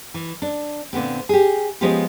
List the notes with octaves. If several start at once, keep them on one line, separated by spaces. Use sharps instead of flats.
E3
D4
A#2 D3 B3 C4
G4 G#4
F3 G#3 B3 C#4 F4 G4